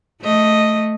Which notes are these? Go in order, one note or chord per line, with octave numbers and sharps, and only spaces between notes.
A3 D#5